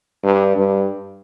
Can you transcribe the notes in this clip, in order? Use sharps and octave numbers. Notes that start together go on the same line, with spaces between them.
G2
G2